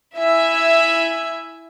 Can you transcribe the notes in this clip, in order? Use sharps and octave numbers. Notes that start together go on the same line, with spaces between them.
E4 E5 G#5